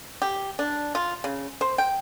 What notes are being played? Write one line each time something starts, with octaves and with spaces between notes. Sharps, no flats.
G4
D4
F4
C#3
C5
G5